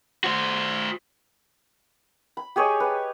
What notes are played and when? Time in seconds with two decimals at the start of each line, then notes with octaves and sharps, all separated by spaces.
0.24 F#4 C5
2.37 B5
2.56 G4 G#4 C#5 D#5
2.80 B4 A5